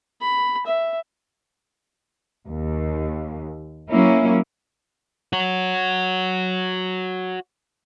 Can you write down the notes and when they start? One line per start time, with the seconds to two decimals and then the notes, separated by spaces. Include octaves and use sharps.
0.21 B5
0.66 E5
2.47 D#2
3.88 F#3 A#3 C#4 E4
5.33 F#4 C#5